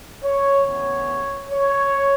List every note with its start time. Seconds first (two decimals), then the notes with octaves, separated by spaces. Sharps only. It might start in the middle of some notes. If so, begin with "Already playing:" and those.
0.24 C#5
0.66 D2 C#3 E3 B3 C#5
1.50 C#5